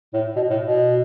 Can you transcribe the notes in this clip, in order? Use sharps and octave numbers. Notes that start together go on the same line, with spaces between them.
A2
B2
A2
B2